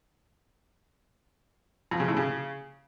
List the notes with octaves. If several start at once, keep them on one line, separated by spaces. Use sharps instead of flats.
F2
C#3
A2
C#3